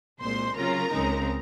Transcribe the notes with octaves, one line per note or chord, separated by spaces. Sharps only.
C2 A#2 G#3 C5 C6
C#3 F#3 C#4 F4 A#4 A#5
C#2 C#3 G#3 C4 D#4